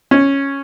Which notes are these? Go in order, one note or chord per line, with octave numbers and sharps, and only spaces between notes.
C#4